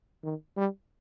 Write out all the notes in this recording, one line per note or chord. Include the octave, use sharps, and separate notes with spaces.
D#3
G3